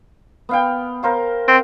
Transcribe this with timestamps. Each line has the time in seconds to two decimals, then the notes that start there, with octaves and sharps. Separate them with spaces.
0.49 B3 F5 G5
1.03 A#4 C5 F5
1.48 C4